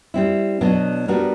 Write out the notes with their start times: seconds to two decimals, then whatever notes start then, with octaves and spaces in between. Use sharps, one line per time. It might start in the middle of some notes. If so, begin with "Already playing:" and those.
0.14 G3 C4 E4
0.61 B2 F#3 B3 D4
1.08 G3 B3 D4 F#4 A#4